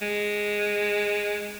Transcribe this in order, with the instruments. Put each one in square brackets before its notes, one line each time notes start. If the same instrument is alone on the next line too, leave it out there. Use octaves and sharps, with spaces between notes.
[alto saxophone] G#3